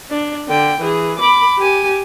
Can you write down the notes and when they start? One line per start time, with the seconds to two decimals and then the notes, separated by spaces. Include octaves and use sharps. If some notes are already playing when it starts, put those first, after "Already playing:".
0.11 D4
0.48 D3 G5
0.81 E3 G#4
1.19 B5 D6
1.58 G4 G#5